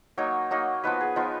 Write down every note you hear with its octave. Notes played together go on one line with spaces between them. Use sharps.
F#3 A#3 D#4 C#5
F#3 A#3 D#4
F3 B3 D#4 B4
G#4
F3 B3 D#4 F4